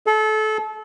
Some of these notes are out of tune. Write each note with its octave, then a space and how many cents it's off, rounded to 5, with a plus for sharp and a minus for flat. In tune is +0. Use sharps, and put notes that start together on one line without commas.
A4 -30